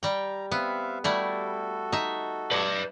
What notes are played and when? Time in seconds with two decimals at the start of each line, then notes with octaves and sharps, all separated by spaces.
0.03 G3 G5 A#5
0.51 B3 C4 E5 F5
1.04 G3 A3 E4 F#4 A4
1.92 D#4 E5
2.52 B4 D5